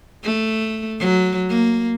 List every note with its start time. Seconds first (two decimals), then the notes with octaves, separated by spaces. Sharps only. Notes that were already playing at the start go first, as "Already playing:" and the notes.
0.24 A3
0.99 F#3
1.49 A#3